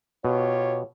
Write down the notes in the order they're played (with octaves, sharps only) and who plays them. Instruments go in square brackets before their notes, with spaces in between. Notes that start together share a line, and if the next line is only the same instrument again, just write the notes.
[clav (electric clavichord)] B2 [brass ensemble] F4 G4 C#5